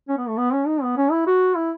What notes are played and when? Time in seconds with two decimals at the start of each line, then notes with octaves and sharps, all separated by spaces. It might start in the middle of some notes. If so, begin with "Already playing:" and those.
0.09 C#4
0.18 B3
0.29 A3
0.38 B3
0.53 C#4
0.67 D#4
0.82 B3
0.97 C#4
1.12 E4
1.27 F#4
1.56 E4